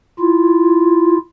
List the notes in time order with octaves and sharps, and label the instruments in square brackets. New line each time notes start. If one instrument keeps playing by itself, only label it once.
[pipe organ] E4 F4